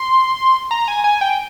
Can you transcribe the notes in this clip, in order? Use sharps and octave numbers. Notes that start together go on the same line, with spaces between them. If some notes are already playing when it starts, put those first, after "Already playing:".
Already playing: C6
A#5
G#5
G#5
G5